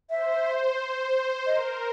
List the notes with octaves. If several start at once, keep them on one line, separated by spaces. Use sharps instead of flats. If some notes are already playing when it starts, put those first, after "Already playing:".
C5 E5
A#4 D#5